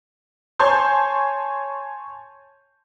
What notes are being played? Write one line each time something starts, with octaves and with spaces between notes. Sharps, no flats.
C#5 G#5 A5 C6 G6